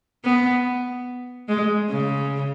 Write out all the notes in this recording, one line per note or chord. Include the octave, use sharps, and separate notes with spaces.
B3
G#3
C#3